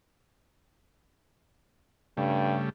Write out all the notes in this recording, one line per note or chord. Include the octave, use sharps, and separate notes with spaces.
G2 C#3 G3 A3